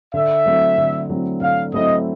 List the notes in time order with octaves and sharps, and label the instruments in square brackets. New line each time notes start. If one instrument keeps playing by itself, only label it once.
[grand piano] D3 [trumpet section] E5
[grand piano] F#3 A3 C4 E4
D3
F#3 A3 C4 E4
[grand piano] D3 [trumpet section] F5
[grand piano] F#3 A3 C4 E4 [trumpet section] D#5